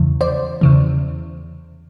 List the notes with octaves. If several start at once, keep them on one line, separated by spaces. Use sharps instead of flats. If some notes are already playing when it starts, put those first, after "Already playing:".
Already playing: E2 C#3 E3
C5 D5
E2 C#3 E3